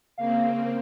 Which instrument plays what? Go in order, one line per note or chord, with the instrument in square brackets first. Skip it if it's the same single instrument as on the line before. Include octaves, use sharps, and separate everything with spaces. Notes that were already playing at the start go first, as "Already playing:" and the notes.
[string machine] C#3 A#3 C4 [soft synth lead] F5